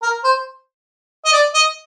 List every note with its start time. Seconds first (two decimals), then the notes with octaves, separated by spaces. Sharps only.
0.03 A#4
0.24 C5
1.25 D#5
1.33 D5
1.54 D#5